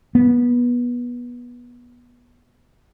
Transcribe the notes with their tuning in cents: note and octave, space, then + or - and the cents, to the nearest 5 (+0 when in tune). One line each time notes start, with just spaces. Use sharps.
B3 -20